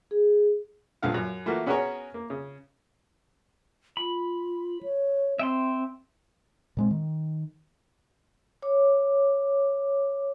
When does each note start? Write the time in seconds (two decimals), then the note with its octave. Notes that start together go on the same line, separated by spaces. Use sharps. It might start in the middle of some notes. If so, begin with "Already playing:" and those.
0.11 G#4
1.02 A#1 G2 A#2 D3 F5 F#5
1.14 F#2
1.46 E3 A3 A#3 F4 F#4
1.66 B3 C#4 F#4 G#4 A#4 C#5
2.14 A#3
2.30 C#3
3.97 F4 B5
4.83 C#5
5.39 C4 E5 G5 C6
6.77 A#2 G#3 C4
6.91 D#3
8.62 C#5 D6